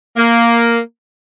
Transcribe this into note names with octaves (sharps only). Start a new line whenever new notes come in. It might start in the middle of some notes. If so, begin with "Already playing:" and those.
A#3